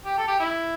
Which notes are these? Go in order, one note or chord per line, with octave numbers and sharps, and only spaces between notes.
G4
A4
G4
E4